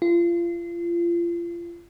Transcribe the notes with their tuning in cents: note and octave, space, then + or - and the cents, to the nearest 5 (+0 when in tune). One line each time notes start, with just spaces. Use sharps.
F4 -30